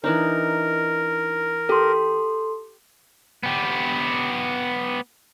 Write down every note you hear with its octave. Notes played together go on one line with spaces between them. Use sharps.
E3 D4 D#4 A#4
G4 A4 C6
B3 G4